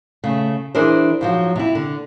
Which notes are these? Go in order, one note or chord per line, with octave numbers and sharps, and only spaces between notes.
C#3 A3
E3 D4 G#4 A#4 C5
G#2 F3 F#3
C3 E4
D3